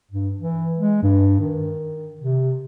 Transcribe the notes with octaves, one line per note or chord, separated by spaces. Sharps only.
G2
E3
G#3
G2
D#3
C3